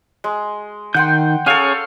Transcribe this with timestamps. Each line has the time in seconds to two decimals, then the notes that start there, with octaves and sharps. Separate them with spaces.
0.24 G#3
0.94 D#3 F#5 G5 C6 G6
1.46 C#4 G#4 A4 C#5 F5